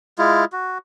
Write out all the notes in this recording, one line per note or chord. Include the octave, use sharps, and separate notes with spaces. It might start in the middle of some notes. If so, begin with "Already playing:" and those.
G#3 E4 F4
F#4